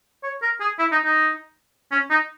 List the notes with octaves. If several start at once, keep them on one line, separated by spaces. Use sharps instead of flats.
C#5
A#4
G#4
E4
D#4
D#4
C#4
D#4